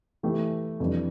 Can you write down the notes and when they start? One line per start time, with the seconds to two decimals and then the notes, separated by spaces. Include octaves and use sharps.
0.23 E3 A3 E4 G4
0.80 F2 E3 G3 D4